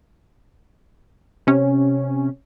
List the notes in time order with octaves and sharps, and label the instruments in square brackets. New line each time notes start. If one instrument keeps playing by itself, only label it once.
[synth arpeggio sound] C3 C#4